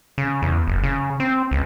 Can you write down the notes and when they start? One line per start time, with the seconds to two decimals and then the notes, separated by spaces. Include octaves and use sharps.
0.18 C#3
0.42 E2
0.68 F#1
0.83 C#3
1.20 C4
1.51 C#2